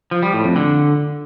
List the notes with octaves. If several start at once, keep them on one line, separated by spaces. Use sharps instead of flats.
F3
G3
A2
F2
D3